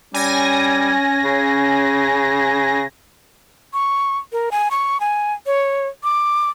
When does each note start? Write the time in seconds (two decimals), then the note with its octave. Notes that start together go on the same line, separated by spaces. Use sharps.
0.14 G3 C#4 G#5 A#6
1.24 C#3
3.73 C#6
4.33 A#4
4.51 G#5
4.71 C#6
5.00 G#5
5.46 C#5
6.04 D6